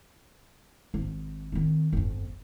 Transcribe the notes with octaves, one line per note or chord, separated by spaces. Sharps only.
G#1
D#3 C4
G1 F2